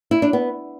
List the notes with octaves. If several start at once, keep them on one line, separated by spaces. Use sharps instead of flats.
E4
D4
B3